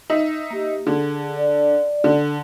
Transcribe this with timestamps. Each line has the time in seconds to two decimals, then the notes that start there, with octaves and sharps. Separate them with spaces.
0.10 D#4 E5
0.50 A#3 G4
0.87 D3 G#4
1.36 D5
2.04 D3